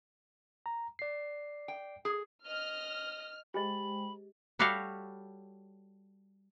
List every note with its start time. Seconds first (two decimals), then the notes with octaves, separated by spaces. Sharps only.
0.66 A#5
0.99 D5 C7
1.68 G5
2.05 G#4
2.46 D#5 F6
3.54 G#3 G4 G#4 C5 D#5 G5 B5
4.59 G3 F#4 G4 A4 C#5 F5